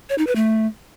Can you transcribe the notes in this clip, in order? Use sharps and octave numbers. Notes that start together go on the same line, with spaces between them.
C#5
D#4
B4
A3